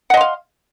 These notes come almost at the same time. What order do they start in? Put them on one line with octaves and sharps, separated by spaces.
F#5 D#5 C6 F5